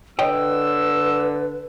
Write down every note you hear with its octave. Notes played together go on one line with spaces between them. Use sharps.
D3 B4 C#5 D#5 G5 E6